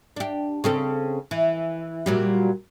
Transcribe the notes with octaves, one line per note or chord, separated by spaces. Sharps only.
D4 G4
C#3 C4 A4
E3
A#2 F#3 G3